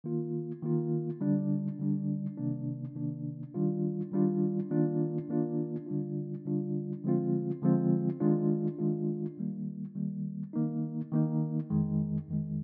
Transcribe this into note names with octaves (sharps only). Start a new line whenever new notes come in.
D#3 A#3 F4
D#3 A#3 F4
D3 G3 D4
D3 G3 D4
C3 D#3 A#3 D4
C3 D#3 A#3 D4
D#3 G3 D4 F4
D#3 G3 D4 F4
D#3 A#3 D4 F4
D#3 A#3 D4 F4
D3 G3 D4 F4
D3 G3 D4 F4
D3 F3 G#3 C4 F4
D3 F3 G#3 C4 F4
D#3 G#3 D4 F4
D#3 G#3 D4 F4
D#3 G3 A#3
D#3 G3 A#3
D#3 A#3 D#4
D#3 A#3 D#4
F2 D#3 G#3
F2 D#3 G#3